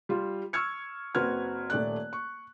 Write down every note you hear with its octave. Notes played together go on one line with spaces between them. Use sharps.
G3 F4
C#6 E6 F6 G#6 C#7
F#1 C4 F#4 B4 F6 G#6
D#1 A3 D5 F#6
C#6